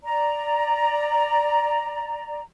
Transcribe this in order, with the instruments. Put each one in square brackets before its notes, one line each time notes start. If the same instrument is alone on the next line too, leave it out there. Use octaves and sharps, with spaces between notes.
[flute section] D5 A#5